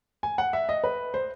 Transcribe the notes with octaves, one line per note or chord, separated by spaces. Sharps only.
G#5
F#5
E5
D#5
B4
C5